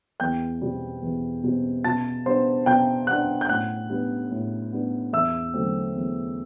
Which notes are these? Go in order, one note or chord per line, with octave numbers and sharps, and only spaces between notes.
E2 G5 G6
B2 G3 C4
E2
B2 G3 C4
B2 A5 A6
G3 B3 D4 C5 C6
B2 G5 G6
G3 B3 D4 F#5 F#6
G6
A2 F#5 F#6
G3 B3 D4
A2
G3 B3 D4
E2 E5 E6
D3 F#3 A3 C4
E2